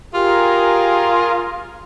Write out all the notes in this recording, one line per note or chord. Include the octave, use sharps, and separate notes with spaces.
F4 G4 G#4 A#4